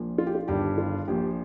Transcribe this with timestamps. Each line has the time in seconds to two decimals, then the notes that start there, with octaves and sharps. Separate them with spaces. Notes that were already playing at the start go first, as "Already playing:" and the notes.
Already playing: A#1 A#2 F3
0.18 F4
0.27 G4
0.35 F4
0.48 G1 G2 D#3 G4
0.78 F4
1.08 A#1 A#2 F3 G4